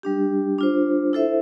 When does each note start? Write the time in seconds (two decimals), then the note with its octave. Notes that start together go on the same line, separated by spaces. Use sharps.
0.03 G3 D4 G4
0.58 D4 F4 C5
1.13 E4 A4 C5 E5